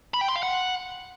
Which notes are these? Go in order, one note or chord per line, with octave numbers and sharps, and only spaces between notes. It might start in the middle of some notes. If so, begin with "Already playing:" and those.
B5
G5
C6
F5
F#5